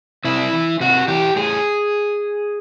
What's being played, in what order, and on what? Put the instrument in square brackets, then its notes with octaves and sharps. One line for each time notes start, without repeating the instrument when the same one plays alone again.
[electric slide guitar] C3 E4
E3
C3 F#4
E3 G4
A2 G#4